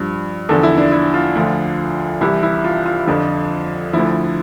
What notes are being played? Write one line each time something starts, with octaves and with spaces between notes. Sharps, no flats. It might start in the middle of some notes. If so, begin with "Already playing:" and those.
Already playing: G2 F3
E2 D3 F3 A4
E4
D4
E4
F4
D2 D3 F3
C2 C3 E3 E4
E4
F4
F4
F2 D3 F3
D2 D3 F3 E4